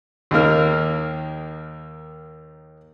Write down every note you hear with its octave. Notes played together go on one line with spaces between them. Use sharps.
D#2 D#3 A#3 F6